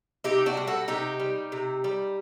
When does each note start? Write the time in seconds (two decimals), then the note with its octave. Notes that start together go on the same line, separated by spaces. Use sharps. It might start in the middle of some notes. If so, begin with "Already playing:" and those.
0.24 C3 D#4 G4
0.46 D4 F#4
0.57 G3
0.67 F#4 A4
0.88 C3 D#4 G4
1.20 G3
1.52 C3
1.84 G3